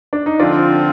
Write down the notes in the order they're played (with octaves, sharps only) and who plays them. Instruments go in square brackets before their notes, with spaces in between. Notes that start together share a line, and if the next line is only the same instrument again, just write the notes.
[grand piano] D4
D#4
[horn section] D3 F3 C4 [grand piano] D4 F4